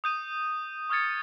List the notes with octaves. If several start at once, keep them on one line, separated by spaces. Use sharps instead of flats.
D#6 G6 D#7
C#6 D#6 F6 G#6 A6 C#7